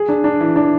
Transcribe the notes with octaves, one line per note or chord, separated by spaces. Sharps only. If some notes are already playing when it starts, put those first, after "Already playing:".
Already playing: G#4
D4
D4
E3
D4